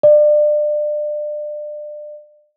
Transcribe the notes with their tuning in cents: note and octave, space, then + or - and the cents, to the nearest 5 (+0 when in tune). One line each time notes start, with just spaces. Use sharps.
D5 +30